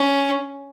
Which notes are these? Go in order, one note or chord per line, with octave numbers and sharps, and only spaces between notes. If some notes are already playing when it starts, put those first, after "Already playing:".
Already playing: C#4